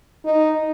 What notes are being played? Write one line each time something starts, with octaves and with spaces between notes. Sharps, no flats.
D#4